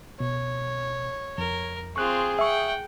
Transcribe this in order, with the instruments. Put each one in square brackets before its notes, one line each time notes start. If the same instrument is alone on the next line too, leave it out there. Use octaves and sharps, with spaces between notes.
[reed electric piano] B2 [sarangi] C#5
[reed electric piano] F2 [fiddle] A#4
[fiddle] C4 F4 [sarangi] G#4 [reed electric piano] C#6 F#6
[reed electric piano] E5 C#6 [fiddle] F#5 G5